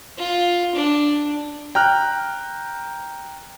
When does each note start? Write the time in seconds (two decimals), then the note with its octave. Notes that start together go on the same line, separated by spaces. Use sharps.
0.18 F4
0.75 D4
1.75 G5 A#5 F6 F#6